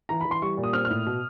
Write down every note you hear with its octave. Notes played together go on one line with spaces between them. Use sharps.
E3 A#5
E3 B5
C6
G3 C#6
A#2
D#6
C4 F6
F6
A2
B2